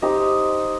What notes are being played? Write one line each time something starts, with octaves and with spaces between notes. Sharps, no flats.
D#4 G4 C5 D#5